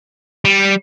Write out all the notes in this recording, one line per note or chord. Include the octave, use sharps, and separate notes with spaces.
G3